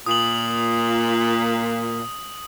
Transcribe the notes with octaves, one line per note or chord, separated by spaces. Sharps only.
A#2 D#6 F#7